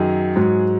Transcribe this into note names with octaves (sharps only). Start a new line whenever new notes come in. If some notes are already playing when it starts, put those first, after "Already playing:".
Already playing: F#2 D#3 F#3 G#4
G#2 F#3